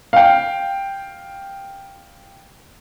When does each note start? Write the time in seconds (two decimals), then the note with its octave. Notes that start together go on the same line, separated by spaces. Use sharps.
0.13 F5 G5